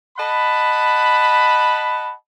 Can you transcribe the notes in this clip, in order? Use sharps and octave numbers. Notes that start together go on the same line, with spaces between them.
D#5 F#5 A5 B5